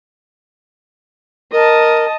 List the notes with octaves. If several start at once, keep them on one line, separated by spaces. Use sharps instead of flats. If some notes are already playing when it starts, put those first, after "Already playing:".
A#4 D#5 A5